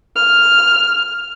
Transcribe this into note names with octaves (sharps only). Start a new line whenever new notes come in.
F6